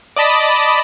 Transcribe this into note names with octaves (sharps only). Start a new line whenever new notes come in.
D5 D#5 A5 B5 D#6